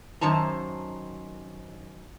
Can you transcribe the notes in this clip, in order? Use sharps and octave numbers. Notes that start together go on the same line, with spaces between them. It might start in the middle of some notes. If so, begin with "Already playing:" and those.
F#2 D#3 C5 A5 A#5